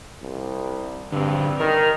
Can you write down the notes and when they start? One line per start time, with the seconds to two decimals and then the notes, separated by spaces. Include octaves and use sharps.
0.22 C2
1.12 G2 D3 C4
1.60 D#3 A#4